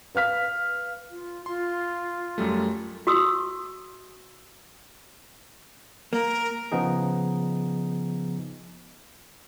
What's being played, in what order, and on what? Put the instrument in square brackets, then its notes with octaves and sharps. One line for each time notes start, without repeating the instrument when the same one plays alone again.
[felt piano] B4 F5 F6 B6
[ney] F4
[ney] F4 [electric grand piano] C6
[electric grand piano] F#2 G3 A3
[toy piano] F#4 C6 C#6 D#6 E6
[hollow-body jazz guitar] A#3 [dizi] A#4
[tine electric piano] C#3 F3 B3 D#4 G#4